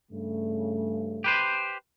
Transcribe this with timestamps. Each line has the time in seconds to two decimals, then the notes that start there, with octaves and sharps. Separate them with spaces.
0.11 G2 C#3 A3
1.24 G4 B4 C5